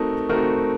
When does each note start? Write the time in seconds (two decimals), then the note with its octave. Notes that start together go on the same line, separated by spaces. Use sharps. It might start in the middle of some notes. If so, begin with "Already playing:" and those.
Already playing: A3 C4 D#4 F#4 A#4
0.29 A3 C4 D#4 F#4 A#4